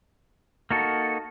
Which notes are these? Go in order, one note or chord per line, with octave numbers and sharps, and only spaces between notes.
A#3 D#4 F#4 A4